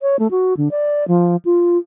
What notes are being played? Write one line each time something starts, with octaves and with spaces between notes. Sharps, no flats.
C#5
A3
F#4
D3
D5
F3
F4